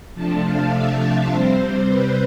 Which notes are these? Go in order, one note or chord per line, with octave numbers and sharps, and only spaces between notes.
C3 F3 A3 D4 A5
F5
E5
C3 G3 C4 C5
C5
B4